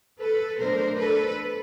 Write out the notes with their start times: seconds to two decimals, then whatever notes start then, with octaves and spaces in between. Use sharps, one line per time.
0.20 A4 B4
0.59 B2 F#3 A3 D4 A#4 C5
0.98 A4 B4